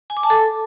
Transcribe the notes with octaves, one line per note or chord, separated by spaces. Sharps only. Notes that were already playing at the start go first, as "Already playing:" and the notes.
G#5
D6
A5
A4